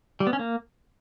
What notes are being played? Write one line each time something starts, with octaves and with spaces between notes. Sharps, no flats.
G3
B3
C#4
A#3